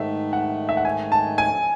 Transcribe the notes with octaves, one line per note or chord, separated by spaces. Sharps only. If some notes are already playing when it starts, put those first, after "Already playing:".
Already playing: G#2 D#3 A3 E5
F#5
E5
F#5
G#5
A5
G#5